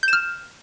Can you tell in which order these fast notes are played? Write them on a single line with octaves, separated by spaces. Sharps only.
G6 E7 F6